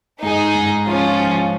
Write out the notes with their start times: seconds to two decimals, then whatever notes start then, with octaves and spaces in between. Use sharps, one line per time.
0.23 G#2 D#4 G#4
0.55 G#2
0.87 F3 C#4 F4
1.19 F3